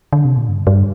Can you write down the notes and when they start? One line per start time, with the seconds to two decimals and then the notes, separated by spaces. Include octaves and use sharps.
0.13 D3
0.25 C3
0.37 A#2
0.49 G2
0.67 G2